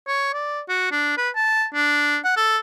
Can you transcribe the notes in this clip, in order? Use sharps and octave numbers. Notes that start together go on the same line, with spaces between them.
C#5
D5
F#4
D4
B4
A5
D4
F#5
A4